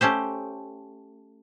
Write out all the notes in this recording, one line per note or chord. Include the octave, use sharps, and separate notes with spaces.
A3 C#4 G4 C5